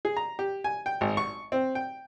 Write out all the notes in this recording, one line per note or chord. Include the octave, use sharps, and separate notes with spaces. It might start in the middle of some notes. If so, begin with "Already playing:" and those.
G#4
A#5
G4
G#5
G5
G#1
C#6
C4
G5